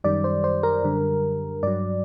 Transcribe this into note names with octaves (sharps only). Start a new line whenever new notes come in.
F#2 D#3 G3 D5
C5
C5
A#4
F#2 D3 G3
G2 F#3 D5